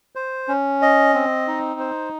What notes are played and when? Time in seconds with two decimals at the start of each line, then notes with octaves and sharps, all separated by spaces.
0.15 C5
0.48 C#4
0.82 D#5
1.14 C4
1.48 D#4
1.80 C5